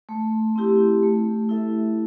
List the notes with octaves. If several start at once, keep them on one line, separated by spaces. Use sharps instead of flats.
A3
C4 E4 G4
A3
E4 A4 E5